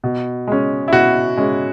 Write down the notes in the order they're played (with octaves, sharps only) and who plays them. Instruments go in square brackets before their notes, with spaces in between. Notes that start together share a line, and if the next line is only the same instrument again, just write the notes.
[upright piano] B2
G#3 C#4
E4
B2 F#4
G#3 C#4